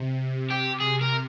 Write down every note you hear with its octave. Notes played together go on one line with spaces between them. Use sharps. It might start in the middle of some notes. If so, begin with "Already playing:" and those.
Already playing: C3
G4
G#4
A#4